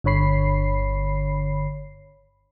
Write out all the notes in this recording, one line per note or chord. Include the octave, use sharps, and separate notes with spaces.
G1 D3 C#5 B5 C7